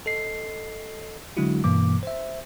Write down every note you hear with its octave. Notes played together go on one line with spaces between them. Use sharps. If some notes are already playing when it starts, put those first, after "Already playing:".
A4 D#5 C7
D3 F#3 G#3 D4 E4 F#4
G2 B2 E3 A#3 D6
C5 E5